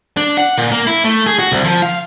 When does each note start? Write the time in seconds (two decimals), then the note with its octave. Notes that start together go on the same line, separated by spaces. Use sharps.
0.17 D4
0.37 F#5
0.58 A#2
0.71 A#3
0.87 E4
1.04 A3
1.27 G#4
1.39 F#4
1.52 C2
1.65 F3
1.82 F5